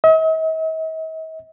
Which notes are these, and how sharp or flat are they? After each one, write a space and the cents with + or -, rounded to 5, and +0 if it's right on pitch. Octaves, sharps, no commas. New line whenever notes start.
D#5 +45